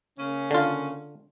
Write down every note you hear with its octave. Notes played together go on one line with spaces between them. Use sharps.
C#3 A#3 C#4
D3 F4